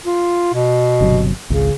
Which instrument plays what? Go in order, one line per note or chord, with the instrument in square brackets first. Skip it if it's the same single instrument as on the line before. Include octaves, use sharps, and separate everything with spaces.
[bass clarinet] F4
B2
[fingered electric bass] G1 C3 F#3
[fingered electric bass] G#1 C#2 [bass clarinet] C#3